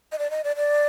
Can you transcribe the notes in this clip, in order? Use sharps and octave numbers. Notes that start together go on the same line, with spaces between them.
D#5
D5
D#5
D5
D5